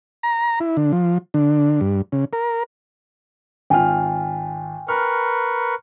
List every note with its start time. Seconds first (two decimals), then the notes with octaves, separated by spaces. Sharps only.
0.23 A#5
0.60 E4
0.77 D3
0.92 F3
1.34 D3
1.81 G2
2.12 C#3
2.33 A#4
3.70 G#1 F4 G5 G#5 F6
4.89 A#4 B4 C#6 F6